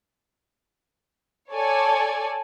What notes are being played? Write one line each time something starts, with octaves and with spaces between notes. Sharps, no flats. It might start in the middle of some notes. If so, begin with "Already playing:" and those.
A4 C#5 D5 G#5 A5